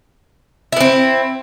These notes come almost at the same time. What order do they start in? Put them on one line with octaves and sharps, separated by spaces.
E4 B3 C4